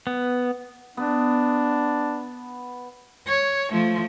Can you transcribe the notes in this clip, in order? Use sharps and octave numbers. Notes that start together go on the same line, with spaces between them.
B3
B3 D4
C#5
F3 A3